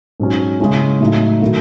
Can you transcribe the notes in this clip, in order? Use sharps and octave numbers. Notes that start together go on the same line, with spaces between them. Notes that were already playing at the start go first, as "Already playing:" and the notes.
G#2 F#3 C#4
C#3 G#3 C#4 E4
A2 F#3 A3 D#4
D#3 F#3 A3 E4